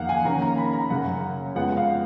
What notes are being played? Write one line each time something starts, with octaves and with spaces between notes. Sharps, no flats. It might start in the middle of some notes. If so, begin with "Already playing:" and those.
Already playing: F2 D#3 A#3 F5 F#5
G#5
D#3 A#3 C#4 A#5
A#5
B5
A#5
F#2 C#3 F#3 C#4 F#5
F2 F3 G#3 B3 F#5
F5